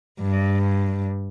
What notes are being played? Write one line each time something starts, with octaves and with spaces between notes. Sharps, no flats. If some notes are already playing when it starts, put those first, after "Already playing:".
G2